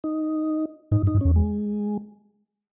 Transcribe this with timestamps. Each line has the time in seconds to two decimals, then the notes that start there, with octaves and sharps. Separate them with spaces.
0.04 D#4
0.91 G#2 D#4
1.03 G2
1.07 D#4
1.14 G2
1.21 E2 C#4
1.36 G#3